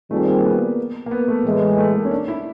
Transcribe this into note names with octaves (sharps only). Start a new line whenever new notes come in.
D#3 G3 A3 C4 F4 G#4
A#3
B3
A#3
B3
A3
A2 E3 G#3
A3
A#3
C#4
D4
E4